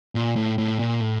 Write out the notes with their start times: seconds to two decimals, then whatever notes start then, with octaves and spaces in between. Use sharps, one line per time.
0.15 A#2
0.36 A2
0.58 A2
0.79 A#2
1.01 A2